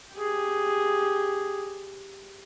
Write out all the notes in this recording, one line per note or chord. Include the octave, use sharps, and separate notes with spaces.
G4 G#4